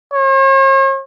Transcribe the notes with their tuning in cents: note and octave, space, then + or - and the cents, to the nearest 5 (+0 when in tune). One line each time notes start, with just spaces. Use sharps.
C#5 -45